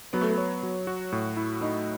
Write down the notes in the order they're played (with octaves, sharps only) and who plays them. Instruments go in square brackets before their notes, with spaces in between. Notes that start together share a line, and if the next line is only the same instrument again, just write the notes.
[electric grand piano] F#3 [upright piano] B3
[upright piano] A3
B3
[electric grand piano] C#5
F#3
F#4
A2
E4
[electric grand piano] A3 [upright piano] D#4